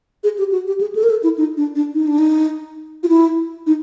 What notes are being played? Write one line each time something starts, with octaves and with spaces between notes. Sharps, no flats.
G#4
G4
F#4
G4
G#4
A4
A#4
A4
E4
D#4
D4
D4
D#4
D4
D#4
F4
E4
D#4